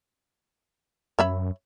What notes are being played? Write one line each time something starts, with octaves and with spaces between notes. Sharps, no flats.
F#2 C#5 E5 B5